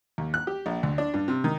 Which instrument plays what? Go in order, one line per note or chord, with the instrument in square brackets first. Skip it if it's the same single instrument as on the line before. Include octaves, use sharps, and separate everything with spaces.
[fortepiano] D#2
F#6
G4
A#1
D2
D4
G2
C3
D#3